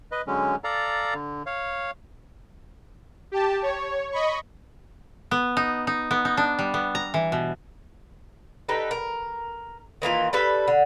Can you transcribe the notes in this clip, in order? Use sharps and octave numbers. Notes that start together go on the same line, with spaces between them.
B4 D#5
D3 F#3 G#3 C#4
A4 D5 F5 A#5
D3
C#5 F5
G4 A5
C#5
D#5 B5 C#6
B3
D#4
D#4
B3
D#4
D4
G3
B3
A#5
E3
B2
D#4 G4 A4 B4
A#4
D#3 E3 A#3 F4
G3 A4 B4
D3